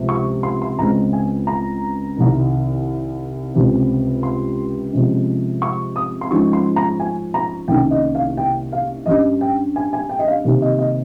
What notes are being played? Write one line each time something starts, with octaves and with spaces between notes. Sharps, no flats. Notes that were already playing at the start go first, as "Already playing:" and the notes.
Already playing: C#2 C3 F3 G#3
C#6
C6
C6
C#2 C#3 G#3 C4 A#5
G#5
A#5
C2 C3 D#3
C#2 C3 G3 C4
C6
C3 F3 G#3 C#4
C#6
D#6
C6
G#2 F3 G#3 C#4 C#6
C6
A#5
G#5
A#5
C2 C3 D#3 A#3 C#4 G5
D#5
F5
G5
F5
G2 G3 C#4 D#5
G5
G#5
G#5
G5
D#5
F5
C3 D#3 G3 A#3
D#5
D#5